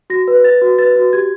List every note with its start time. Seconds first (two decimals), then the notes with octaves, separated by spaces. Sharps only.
0.10 F#4 A#6
0.28 B4
0.44 B4 A6
0.61 F#4
0.79 B4 A6
0.96 F#4
1.13 G4 G#6